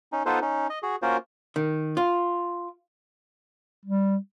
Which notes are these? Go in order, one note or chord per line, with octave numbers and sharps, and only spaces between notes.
C#4 D#4
B3 D#4 F4 A4 B4 C5
C#4 D#4
D#5
F#4 G#4
A#3 C#4 F4 F#4 A#4 C5
D#3
F4
G3